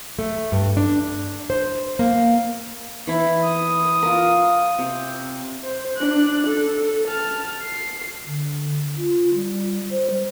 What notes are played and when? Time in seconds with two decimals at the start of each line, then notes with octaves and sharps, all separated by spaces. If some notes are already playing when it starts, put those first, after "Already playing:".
0.19 A3
0.52 G2
0.77 D4
1.50 C5
1.99 A#3
3.07 E3 E4
3.44 D#6
4.03 F4 A#4
4.79 C3
5.64 C5
5.97 D4 F#6
6.47 A4
7.08 A5 F6
7.62 C7
8.26 D3
8.97 F4
9.34 G3
9.91 C5
10.10 G3